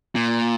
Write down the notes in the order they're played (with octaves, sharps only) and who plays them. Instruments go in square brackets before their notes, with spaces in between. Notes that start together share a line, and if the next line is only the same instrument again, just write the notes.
[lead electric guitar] A#2